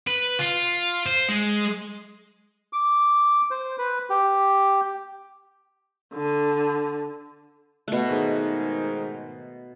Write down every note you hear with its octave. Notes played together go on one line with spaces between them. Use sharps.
B4
F4
C5
G#3
D6
C5
B4
G4
D3
B2 A3
G#2 D#3